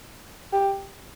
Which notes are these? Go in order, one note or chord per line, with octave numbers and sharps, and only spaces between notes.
G4